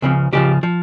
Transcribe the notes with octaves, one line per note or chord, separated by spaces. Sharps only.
C#2 C#3 F3 C4
C#2 C#3 F3 G4
F3